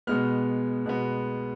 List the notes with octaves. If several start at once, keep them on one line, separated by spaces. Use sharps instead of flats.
B2 G#3 B3 F6
B2 G#3 B3